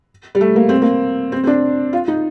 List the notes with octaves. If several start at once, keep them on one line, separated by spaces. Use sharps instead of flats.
G3
A3
A#3
C4
A#3
C4
C4
D4
F4
D#4